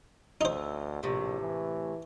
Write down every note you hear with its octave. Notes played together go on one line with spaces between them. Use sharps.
D2 D#4 C5 E5
A#1 A2 C3
E3